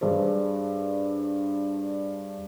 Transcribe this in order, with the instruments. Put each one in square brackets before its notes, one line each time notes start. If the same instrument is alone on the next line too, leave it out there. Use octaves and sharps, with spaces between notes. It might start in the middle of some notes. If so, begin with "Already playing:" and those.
[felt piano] G2 D4 G#4 C5